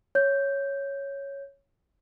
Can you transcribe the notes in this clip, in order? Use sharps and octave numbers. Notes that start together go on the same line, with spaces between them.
C#5 G6